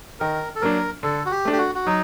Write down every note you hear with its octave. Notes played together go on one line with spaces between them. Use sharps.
D#3 A#4
A4
F#3 A#3 D4 A#4
D3 A4
F#4
G4
A3 D4
G4
F#4
F#4
F#3 D#4